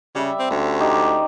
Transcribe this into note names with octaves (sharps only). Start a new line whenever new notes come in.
C#3 G3 E5
C4
D2 C#4 C5 E5
D#4 G4 D5